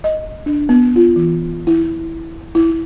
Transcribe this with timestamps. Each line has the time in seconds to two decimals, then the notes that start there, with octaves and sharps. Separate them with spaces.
0.04 D#5
0.46 D4
0.69 B3
0.96 F4
1.16 E3
1.67 E4
2.55 E4